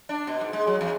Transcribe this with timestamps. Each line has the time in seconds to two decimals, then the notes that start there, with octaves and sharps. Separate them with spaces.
0.09 D4
0.27 B2
0.41 G#2
0.53 G#3
0.67 F#3
0.81 E2